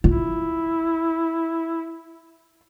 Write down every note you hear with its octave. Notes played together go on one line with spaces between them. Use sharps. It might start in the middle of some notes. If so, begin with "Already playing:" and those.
E4 F4